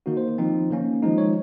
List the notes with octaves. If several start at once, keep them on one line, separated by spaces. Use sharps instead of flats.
D#3 A#3 D#4 F#4
C5
F3 C4 D#4
D#3 A#3 C#4
F3 G#3 D#4
C#5